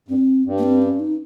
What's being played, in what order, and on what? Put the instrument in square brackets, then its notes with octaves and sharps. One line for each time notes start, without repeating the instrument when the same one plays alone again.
[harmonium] G2 [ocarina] C4
[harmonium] G2
[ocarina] A#3
C4
C#4
D#4